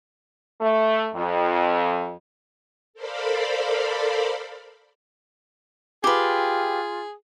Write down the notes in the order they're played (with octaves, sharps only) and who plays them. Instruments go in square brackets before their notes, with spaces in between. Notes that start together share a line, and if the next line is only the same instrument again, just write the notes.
[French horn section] A3
F2
[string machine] A4 A#4 C5 D5 F5 B5
[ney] F4 [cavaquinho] G4 B4 [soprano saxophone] G#4